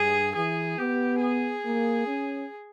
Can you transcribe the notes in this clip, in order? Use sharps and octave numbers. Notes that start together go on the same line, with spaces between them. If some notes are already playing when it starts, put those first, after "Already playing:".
Already playing: G2 G#4
E3 G#4
B3 G4
G#4
A#3
C#4